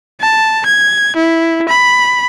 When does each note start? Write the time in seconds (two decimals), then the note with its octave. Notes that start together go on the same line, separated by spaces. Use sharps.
0.21 A5
0.66 G#6
1.16 E4
1.69 B5